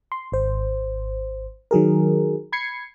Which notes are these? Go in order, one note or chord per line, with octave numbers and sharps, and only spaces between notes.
C6
G#1 C5
D#3 F#3 G#4 A#4
B5 G#6 C7 C#7